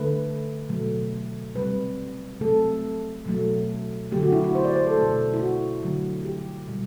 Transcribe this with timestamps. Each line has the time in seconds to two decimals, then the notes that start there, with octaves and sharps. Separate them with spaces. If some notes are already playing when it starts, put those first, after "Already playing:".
Already playing: D3 A3 B4
0.69 B2 F#3 A3
1.55 C3 G3 B4
2.40 C3 F#3 A3 A4
3.26 B2 F#3 A3
4.12 D3 F#3 A3 G4
4.23 F#4
4.32 E4
4.44 F#4
4.55 C5
4.65 D5
4.76 C5
4.86 A4
4.97 B2 A3
5.34 E4
5.40 F#4
5.83 D3 F#3 A3
6.25 G4
6.68 B2 G3